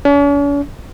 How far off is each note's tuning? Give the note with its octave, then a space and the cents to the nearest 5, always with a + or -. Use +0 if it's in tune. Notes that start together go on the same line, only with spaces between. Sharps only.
C#4 +45